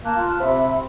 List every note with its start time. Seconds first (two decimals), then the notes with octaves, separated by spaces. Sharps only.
0.05 A#3 A5 F#6
0.18 F4
0.40 C3 C4 E5 F#5 B5